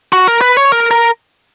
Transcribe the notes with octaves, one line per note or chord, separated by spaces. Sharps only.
F#4
A#4
B4
C#5
A#4
A#4